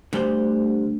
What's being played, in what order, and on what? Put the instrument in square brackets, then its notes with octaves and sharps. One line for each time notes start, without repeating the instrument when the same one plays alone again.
[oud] D2 [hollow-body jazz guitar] D3 G3 C5